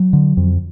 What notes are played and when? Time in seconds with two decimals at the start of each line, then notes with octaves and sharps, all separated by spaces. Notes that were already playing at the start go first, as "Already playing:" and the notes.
Already playing: F#3
0.13 D3
0.37 F2